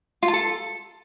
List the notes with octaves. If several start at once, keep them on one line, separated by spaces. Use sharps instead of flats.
F4
A5
A4